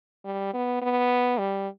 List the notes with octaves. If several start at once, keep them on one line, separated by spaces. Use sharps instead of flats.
G3
B3
B3
G3